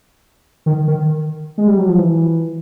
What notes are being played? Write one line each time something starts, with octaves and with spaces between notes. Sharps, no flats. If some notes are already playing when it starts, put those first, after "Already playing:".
D#3
D#3
G#3
G3
F#3
F3
E3